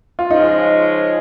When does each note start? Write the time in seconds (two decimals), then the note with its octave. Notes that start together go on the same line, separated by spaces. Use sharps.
0.19 F4
0.30 C#3 F3 G#3 D#4